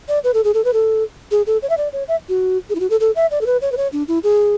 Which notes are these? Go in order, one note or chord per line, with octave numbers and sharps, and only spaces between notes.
D5
B4
A4
G#4
A4
B4
A4
G#4
A4
C#5
E5
D5
C#5
E5
F#4
G#4
E4
F#4
A4
A4
E5
D5
A4
B4
C#5
B4
C#5
D4
E4
G#4